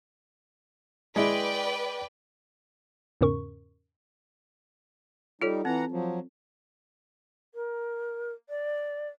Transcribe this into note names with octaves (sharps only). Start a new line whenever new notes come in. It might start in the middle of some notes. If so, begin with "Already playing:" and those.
G#3 E4 B4 D5 G5
E2 G#2 C#3 C#4 A#4 C#6
G3 D#4 F4 A4 C#5
E3 C4 F#5 A#5
F3 F#3
A#4
D5